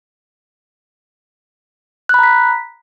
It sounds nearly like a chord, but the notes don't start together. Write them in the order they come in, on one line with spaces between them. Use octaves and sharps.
F#6 B5 A#5 B6